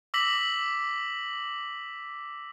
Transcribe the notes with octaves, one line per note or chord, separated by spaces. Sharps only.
D6 E6 A#6 B6 F#7